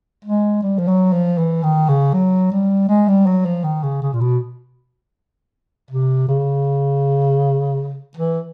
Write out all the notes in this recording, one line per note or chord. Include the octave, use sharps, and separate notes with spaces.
G#3
G3
F3
F#3
F3
E3
D#3
C#3
F#3
G3
G#3
G3
F#3
F3
D#3
C#3
C#3
A#2
B2
C3
C#3
E3